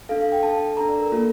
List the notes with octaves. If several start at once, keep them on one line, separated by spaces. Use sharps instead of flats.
D4 A4 F5
F5
G5
D4 A4 A5
D4 A4 A#5
D5
A#4
A#3 F4 A4